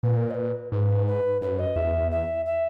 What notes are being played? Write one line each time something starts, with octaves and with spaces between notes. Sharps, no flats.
A#2 B4
A#4
D#5
B4
G#2 B4
B4
F#2 B4
D#5
E2 E5
E5
E5